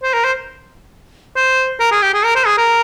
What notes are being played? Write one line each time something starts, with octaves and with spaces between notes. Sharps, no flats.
C5
A#4
C5
C5
A#4
G#4
G4
G#4
A#4
C5
G#4
A#4